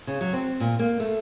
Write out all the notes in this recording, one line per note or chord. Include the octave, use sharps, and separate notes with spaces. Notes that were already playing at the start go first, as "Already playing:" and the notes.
C#3
F#3
C4
A#2
A#3
A3